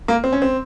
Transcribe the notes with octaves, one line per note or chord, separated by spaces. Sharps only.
A#3
C4
C#4
C4